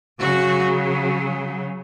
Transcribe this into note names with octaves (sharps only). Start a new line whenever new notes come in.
C#3 F#3 F#4